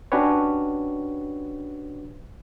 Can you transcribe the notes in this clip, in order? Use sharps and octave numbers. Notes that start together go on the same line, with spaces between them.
C#4 D4 F#4 G4 B4 C#5